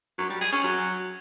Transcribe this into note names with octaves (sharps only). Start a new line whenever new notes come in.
F#3
G3
G#4
C#4
F#3